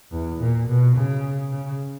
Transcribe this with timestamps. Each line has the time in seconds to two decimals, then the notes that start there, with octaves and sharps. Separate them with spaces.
0.12 E2
0.40 A#2
0.68 B2
0.96 C#3
1.52 C#3